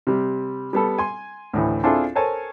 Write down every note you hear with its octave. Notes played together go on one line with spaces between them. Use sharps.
C3 G3
G3 B3 A4
G#5 C6
D2 A2 E3
C4 D4 E4 F4 G#4 A4
A4 A#4 C5 C#5 G#5 A5